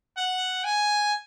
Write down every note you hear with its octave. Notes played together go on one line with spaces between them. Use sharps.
F#5
G#5